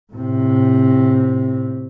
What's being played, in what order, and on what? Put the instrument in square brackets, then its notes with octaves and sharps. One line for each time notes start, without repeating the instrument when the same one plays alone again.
[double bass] A2 C3